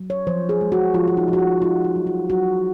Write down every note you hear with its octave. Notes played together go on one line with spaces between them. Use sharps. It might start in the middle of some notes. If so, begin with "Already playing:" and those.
Already playing: F#3
C#5
F3 C5
G#4
G#3
F#4
F3 F4
F4
D#4
F3
F#4
F4
D#4 F4
D#4
F#3
F4
F#3 F#4